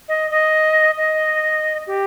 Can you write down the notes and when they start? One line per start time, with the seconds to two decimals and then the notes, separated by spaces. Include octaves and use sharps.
0.09 D#5
0.31 D#5
0.97 D#5
1.87 G4